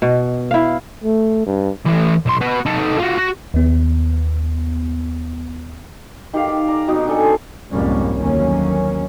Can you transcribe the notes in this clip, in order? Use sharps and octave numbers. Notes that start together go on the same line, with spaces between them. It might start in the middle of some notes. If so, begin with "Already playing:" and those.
B2
E4 F5
A3
G2
A2 E3
B1 C6
F#4 B4
D#4 A4
F4 F#4
F#4
D#2 B3
D#3 G4 F5
D5
D5 A#5
B2 F#3 C4 D#4
D4 A4 G#5
C#4 C5
C2 F2 G#2 G3 A#3 C#4
G1 D#2 F#3 A#3 C#4